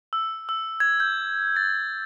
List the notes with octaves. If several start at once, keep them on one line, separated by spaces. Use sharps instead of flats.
E6
E6
G#6
G6
A6